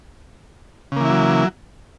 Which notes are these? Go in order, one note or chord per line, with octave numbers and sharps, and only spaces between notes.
C#3 E3 F#3 A#3 E4